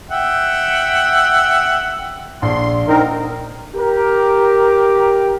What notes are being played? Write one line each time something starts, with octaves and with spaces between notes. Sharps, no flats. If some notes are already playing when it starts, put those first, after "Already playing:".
E5 F#5 G5
A#1 C6
D3 C4 D#4 A#4
G4 A#4